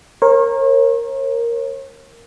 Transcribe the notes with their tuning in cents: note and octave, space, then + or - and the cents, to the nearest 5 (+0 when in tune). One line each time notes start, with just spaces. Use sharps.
A#4 +0 C#5 -40